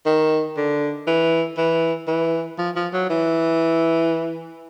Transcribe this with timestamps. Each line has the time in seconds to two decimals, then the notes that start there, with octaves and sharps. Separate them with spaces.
0.06 D#3
0.57 D3
1.07 E3
1.57 E3
2.08 E3
2.58 F3
2.76 F3
2.93 F#3
3.10 E3